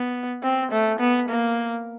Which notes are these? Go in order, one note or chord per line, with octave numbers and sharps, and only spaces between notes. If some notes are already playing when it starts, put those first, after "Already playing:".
Already playing: B3
C4
A3
B3
A#3